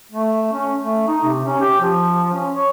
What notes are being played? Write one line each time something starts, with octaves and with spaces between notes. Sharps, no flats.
A3
C#4
A3
D#4
C3
C#4
G4
F3
C#4
C#5